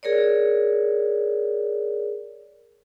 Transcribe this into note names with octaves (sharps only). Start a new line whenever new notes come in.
G#4 A#4 C#5 D5